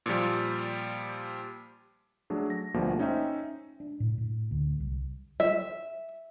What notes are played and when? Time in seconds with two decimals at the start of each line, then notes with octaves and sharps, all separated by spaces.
0.06 A#2 F3 G3
2.30 F#3 A3 D4 G#4
2.50 A#6
2.74 D2 B2 F3 G3 A3 A#3
2.99 C#4 D#4 C5 E5 G5
3.80 D4
4.00 A2
4.18 A2
4.51 D2
4.80 C2
5.40 E5